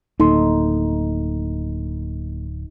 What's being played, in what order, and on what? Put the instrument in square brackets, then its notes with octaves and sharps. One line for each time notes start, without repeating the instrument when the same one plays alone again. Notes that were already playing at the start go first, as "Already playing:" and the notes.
[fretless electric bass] D1 [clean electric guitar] A#3 A4 C6 [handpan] D#4